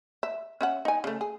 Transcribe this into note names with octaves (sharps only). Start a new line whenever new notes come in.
E5
C#4 E5 F#5
D#4 G#5
C#3 A3
G#4